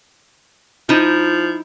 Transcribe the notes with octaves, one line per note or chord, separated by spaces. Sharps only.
F3 D#4 E4